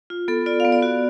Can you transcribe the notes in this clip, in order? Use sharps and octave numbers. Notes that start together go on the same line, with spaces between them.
F4
B3 A4
F4 D5
B3 F5
D5
F#4